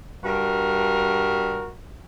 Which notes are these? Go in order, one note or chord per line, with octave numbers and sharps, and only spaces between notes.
G2 F#4 A#4